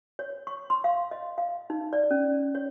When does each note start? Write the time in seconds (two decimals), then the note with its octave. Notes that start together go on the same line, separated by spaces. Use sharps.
0.19 C#5
0.47 C#6
0.70 C6
0.84 F5
1.11 D#5
1.38 F5
1.70 D#4
1.93 D5
2.11 C#4
2.55 C#5